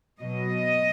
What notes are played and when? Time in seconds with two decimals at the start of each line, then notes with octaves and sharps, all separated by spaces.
0.20 B2 F#3 D#5